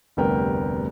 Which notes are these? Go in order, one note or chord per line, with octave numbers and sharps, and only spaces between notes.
F1 D2 G3 B3 A#4 G5